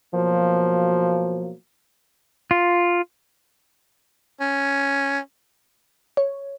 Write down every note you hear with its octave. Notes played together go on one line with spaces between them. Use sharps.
B2 F3 F#3 A#3
F4
C#4
C#5